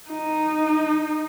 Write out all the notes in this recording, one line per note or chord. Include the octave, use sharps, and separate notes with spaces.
D#4